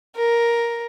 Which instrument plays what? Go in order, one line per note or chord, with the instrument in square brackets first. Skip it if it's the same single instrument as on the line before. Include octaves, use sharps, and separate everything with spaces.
[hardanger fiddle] A#4